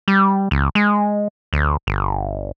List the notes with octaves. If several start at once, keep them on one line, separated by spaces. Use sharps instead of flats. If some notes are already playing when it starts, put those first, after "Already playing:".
G3
C#2
G#3
D2
G1